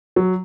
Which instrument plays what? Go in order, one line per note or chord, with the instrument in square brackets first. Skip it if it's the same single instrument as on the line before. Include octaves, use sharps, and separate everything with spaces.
[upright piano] F#3